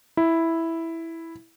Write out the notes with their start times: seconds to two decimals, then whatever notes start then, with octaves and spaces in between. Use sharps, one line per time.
0.17 E4